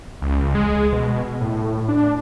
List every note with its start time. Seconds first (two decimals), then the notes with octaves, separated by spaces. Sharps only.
0.22 C#2
0.55 G#3
0.92 B2
1.41 A2
1.89 D4